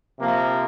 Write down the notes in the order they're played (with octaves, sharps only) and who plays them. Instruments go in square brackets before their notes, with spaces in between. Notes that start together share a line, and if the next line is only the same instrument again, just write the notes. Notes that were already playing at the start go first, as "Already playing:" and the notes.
[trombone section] C3 F3 A#3